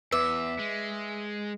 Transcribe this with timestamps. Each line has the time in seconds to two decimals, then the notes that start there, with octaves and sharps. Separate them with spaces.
0.12 E2 B4 E5 D6
0.59 G#3